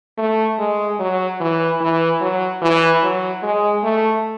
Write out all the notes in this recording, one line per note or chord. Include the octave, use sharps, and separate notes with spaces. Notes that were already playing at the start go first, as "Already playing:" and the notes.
A3
G#3
F#3
E3
E3
F#3
E3
F#3
G#3
A3